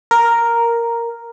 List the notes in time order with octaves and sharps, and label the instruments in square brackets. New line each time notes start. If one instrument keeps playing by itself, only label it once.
[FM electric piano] A#4